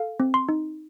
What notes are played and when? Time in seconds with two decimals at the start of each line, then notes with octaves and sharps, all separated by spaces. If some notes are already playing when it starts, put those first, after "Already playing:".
Already playing: A4 F5
0.20 C4
0.34 C6
0.49 D#4